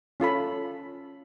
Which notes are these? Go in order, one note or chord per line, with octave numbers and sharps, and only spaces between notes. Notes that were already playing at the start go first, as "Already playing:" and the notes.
C#4 F4 A4 B5